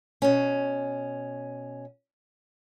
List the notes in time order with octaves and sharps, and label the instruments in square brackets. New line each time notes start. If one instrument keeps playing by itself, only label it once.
[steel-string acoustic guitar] B2 C#4